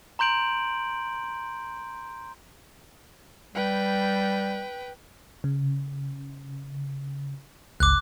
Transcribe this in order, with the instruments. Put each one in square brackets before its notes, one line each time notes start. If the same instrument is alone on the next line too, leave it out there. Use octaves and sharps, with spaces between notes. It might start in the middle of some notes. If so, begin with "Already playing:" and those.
[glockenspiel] A#5 C6 G6 D7 F#7
[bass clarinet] G3 [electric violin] B4 G5
[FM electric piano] C#3
[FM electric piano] G1 C#2 [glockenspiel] D6 F#6